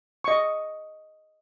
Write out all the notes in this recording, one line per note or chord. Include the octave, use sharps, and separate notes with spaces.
D#5 C#6